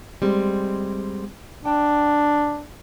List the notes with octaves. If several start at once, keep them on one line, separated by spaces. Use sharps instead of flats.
G3 G#3 C4
D4 G5